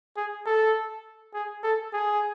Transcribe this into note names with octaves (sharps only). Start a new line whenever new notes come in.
G#4
A4
G#4
A4
G#4